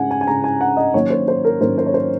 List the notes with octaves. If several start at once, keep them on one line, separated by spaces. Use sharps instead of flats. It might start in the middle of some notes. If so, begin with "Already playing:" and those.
Already playing: C#3 G#3 C#4 F#5 G#5
G#5
G#5
C#3 G#3 C#4 A#5
G#5
F#5
D#5
D#3 F#3 A#3 C#4 C#5
C5
C5
A#4
D#3 F#3 A#3 C#4 C5
C5
C#5
C5